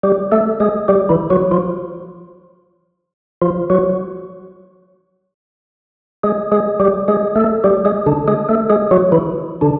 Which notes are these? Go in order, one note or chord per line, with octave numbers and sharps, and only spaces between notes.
G3 G4
A3 A4
G#3 G#4
G3 G4
E3 E4
F#3 F#4
F3 F4
F3 F4
F#3 F#4
G#3 G#4
G#3 G#4
G3 G4
G#3 G#4
A3 A4
G3 G4
G#3 G#4
D3 D4
G#3 G#4
A3 A4
G#3 G#4
F#3 F#4
E3 E4
D3 D4